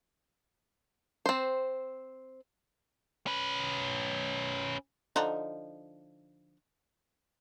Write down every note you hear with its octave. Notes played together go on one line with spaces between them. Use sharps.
C4 C5
C#4 B4
D3 F3 D#4